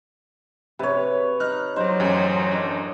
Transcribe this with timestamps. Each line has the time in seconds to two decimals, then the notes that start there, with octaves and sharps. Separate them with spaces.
0.79 C3 B4 C#5
1.40 D#4 F6 F#6
1.76 F#3 D#4 C5 D5
2.00 A1 F#2 G4 G#4
2.52 D4 C#5 D#5